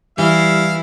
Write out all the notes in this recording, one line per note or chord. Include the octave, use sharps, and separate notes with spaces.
E3 G3 E4 F5